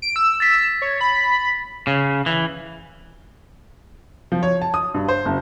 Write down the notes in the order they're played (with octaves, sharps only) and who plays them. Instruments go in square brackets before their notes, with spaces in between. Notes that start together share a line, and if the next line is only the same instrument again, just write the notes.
[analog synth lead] D7
E6
[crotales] A6 B6
[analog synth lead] C#5
B5
[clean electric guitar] C#3
E3
[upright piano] F3
C#5
A5
D#6
G2
C5
F#1